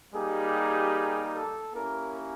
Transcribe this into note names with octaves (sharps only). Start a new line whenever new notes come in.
G3 A#3 D#4 G4 G#4
A4
A#3 C#4 E4 G4 A#4